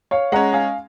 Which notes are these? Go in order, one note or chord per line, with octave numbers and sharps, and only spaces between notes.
C#5 F5
G#3 C#4 F#5 A#5
F5 G#5